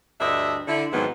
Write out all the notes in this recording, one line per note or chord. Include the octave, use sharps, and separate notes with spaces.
D2 G2 D4 D#5 E5
D3 E4
F2 G#2 D#3 E3 F#3 B3